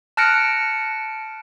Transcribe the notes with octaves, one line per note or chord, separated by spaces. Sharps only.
A5 F6 F#6 A#6 C#7 D7